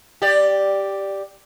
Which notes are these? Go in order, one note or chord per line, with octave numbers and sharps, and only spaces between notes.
G4 D5